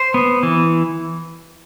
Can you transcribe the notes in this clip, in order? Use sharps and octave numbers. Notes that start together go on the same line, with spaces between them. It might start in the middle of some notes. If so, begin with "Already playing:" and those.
Already playing: C5
B3
E3